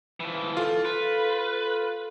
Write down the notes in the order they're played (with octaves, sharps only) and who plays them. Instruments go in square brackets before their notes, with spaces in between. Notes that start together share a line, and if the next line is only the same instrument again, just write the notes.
[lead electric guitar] E3 F3
[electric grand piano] F4 [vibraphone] A4
[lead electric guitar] B4